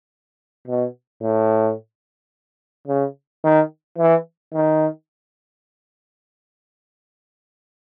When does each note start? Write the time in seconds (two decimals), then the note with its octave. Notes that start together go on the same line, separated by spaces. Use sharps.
0.68 B2
1.22 A2
2.88 C#3
3.44 D#3
3.98 E3
4.54 D#3